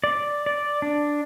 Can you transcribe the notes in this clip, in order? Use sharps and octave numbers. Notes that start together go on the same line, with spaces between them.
D5
D5
D4